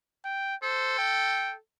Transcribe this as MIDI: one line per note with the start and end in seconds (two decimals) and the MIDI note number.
0.25 0.55 79
0.63 1.58 69
0.63 0.97 72
0.99 1.55 79